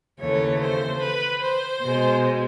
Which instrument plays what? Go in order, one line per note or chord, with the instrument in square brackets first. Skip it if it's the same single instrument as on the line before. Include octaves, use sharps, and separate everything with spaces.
[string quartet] D#2 C#3 E3 A3 C#5
C5
B4
C5
B2 G#3